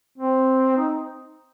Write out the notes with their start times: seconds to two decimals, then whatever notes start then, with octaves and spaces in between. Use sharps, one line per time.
0.18 C4
0.77 D#4